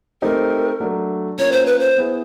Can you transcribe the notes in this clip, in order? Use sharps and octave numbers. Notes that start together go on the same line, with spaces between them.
A3 C4 D#4 G4 A#4
F#3 A3 D4
A#3 C#4 F4 A#4 C#5
C5
B4
C5
B3 E4 G#4 B4